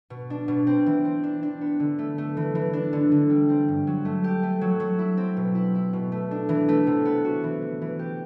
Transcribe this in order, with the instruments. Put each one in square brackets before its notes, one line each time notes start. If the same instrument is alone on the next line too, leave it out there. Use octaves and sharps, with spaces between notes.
[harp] B2
D4
B2
C4
E3
C4
D4
D4
B3
D3
A3
A3
E3
E3
D4
D3
D3
G3
C4
G2
F#3
A3
G4
A3
F#3
F#3
E4
C4
B2
E4
E4
B2
A3
D4
E3
A3
C3
B3
F#4
E3
E3
E3
G4